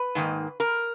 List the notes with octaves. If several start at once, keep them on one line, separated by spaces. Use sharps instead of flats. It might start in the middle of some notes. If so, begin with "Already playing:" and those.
Already playing: B4
G#2 D#3 A#3
A#4